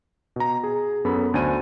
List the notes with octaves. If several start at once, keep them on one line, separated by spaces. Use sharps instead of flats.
B2 A#5
G#4
F#2 B3 A4 B5
D2 D4 C5 G#5 D#7